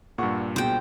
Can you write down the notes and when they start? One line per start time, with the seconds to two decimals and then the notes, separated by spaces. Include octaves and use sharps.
0.18 G2 A#2 F#5 C#6
0.56 C#2 B2 C5 G5